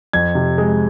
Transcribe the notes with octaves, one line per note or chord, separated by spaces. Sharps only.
F2 G#6
C3
G#3